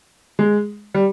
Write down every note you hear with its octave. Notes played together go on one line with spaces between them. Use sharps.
G#3
G3